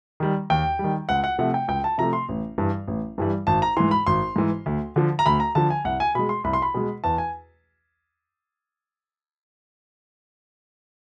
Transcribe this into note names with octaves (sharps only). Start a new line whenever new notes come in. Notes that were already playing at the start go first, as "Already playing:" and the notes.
D#3 G3
D#2 G5
D#3 G3
C#2 F#5
F#5
C3 F3 A3 F#5
G5
C#2 G5
A5
C3 F3 A3 A#5
C6
A1
G2 E3 G3
A1
G2 E3 G3
G#1 A5
A#5
G#2 E3 C6
B5
G#1 C6
G#2 E3
D2
D3 F3
A#5
D2 B5
A#5
D3 F3 A5
G#5
C2 F#5
G#5
B2 G#3 B5
C6
C2 B5
C6
B5
B2 G#3
E2 A5
G#5